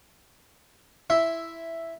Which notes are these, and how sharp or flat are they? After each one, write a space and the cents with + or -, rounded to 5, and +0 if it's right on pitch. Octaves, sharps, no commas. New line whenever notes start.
E4 +5 E5 +0 C6 +0